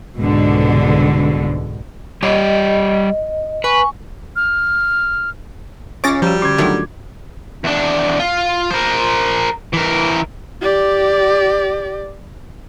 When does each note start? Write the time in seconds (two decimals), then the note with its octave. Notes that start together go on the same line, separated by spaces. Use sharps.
0.16 C2 G#2 B2 D3
2.23 G3 G4 C#5 D#5
3.64 B4 G#5 C#6
4.36 F6
6.04 C#3 C#4 F4 C#5 D#5 D6 A6 A#6
6.22 F3 G3 F#4 A#5
6.42 D3 C#4 D6 G#6
6.58 D#3 F#3 A3 D4 F4 G5
7.64 E2 D4
8.19 F4
8.71 A#4 C5
9.74 E3 A#4
10.61 G4 D5